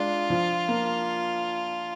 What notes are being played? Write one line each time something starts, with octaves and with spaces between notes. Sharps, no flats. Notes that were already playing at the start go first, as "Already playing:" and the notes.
Already playing: G#3 D4 F4
F3
A#3